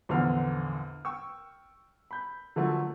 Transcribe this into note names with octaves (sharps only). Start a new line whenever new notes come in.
A#1 E2 D3 B3 C5 F6
G5 C#6 E6
B5 G6
D3 F3 F#3 A3 A#3